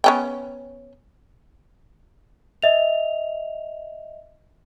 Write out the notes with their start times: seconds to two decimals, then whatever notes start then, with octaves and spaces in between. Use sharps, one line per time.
0.04 B3 C#4 G5
2.62 D#5 E5 F7